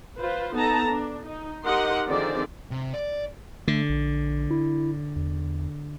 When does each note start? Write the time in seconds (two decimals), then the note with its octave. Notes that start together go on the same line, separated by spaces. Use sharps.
0.19 F4 B4 C5
0.56 B3 D#4 A4 A5 A#5
0.89 D4
1.24 D#4
1.65 D#4 G4 A#4 D#5 F#5 C6
2.08 D3 D#3 F3 C4 G#4 D5
2.71 C3
2.94 D5
3.68 D3 A3
3.90 A#1
4.51 E4
5.16 E2